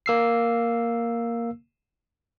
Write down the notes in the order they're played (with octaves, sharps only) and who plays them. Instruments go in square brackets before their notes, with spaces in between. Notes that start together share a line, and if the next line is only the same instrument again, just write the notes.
[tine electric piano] A#3 E6 C7